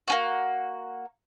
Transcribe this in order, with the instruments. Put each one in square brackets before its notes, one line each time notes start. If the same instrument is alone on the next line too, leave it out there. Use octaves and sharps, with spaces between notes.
[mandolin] A#3 C#4 F#4